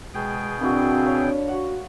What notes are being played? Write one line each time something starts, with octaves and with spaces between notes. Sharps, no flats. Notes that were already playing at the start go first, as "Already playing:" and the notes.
B2 G#3 G#4 G5
A#3 C4 D4 E4 F#4
C#5 F5 B5
F#4 F#5